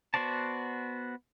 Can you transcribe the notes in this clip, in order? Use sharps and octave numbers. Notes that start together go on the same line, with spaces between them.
B3 F#4 C5 D5 A5